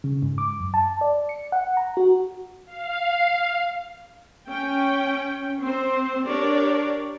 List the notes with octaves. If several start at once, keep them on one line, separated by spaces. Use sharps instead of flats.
C#3
G#2
D6
F#2
A5
D5
C#7
F#5
A#5
F#4
F5
C#4 G5
C4 C5
D4 G4 A#4 C#5 D5